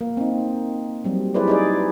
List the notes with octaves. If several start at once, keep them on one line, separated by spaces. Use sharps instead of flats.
A#3
C4 D#4
F#3 G3 C4
E4 G4 G#4 B4 C5 D5
D#4 G#4 D5